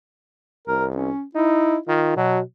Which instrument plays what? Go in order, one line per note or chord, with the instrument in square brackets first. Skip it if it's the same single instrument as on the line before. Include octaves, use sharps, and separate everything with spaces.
[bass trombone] C2 [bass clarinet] A#4
[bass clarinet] C#4
[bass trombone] D#4 [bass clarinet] E4
[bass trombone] D#3 [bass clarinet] F4
[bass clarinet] B2 [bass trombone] F#3